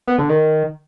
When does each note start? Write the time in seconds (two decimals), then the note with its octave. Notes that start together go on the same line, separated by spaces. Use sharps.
0.07 B3
0.18 D3
0.29 D#3